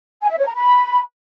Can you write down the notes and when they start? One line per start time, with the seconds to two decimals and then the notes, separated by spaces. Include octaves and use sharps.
0.21 G#5
0.30 E5
0.38 C#5
0.47 A#5
0.56 B5